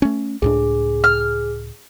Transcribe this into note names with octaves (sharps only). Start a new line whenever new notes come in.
A3 C#4
C#2 A2 D4 G#4
F6